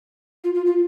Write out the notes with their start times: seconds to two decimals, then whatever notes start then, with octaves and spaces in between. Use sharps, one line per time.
0.44 F4
0.54 F4
0.66 F4